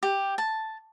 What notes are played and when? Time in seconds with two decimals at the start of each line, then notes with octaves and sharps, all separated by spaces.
0.03 G4
0.38 A5